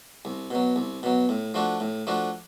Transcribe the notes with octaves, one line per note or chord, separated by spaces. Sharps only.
C2
B2 F#3
C2
B2 F#3
A2
F3 A3 D4 F#4
A2
F3 A3 D4 F#4